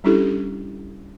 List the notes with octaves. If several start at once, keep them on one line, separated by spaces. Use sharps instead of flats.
G3 C#4 D4 E4 G4 A4